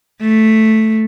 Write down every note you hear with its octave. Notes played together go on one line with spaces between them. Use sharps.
A3